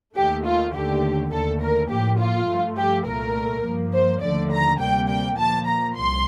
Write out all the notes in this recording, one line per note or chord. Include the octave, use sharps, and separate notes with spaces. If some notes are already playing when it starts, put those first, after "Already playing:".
D#2 D#3 A3 G4
F4
D#2 D3 A3 G4
D#2 D3 A3 A4
A#4
A2 F3 A#3 G4
F4
G2 F3 A3
G4
C2 A#2 A3 A#4
G2 F3 A#3
C5
D#2 D3 F3 A3 D5
A#5
D2 C3 G3 A#3 G5
G5
A#2 F3 A#3 A5
A#5
C2 C6